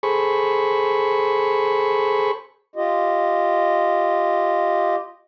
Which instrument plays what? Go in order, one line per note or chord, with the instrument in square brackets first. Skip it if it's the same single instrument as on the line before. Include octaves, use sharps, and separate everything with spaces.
[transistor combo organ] G#4 A4 C5 B5 C#6
[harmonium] F4 G4 D#5